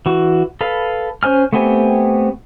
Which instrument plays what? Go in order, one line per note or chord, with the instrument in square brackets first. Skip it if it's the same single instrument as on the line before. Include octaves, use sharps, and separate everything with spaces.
[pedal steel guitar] E3 F#4
A4 B4 F5
C#4 C5 G#5 F6
A3 B3 C4 G4 G#5